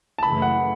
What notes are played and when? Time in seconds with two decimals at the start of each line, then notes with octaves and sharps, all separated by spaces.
0.18 A5
0.22 F#1 F#2 C#3 E3 A3 B5
0.42 F#5